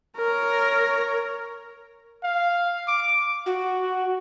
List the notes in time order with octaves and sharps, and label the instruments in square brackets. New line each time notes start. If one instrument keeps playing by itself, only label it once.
[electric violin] A#4 C#5
[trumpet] F5
D6
[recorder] F#4